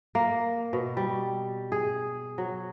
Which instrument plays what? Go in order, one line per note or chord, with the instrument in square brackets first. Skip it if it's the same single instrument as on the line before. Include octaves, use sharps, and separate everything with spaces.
[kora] A#3
B2
G3
G#4
F#3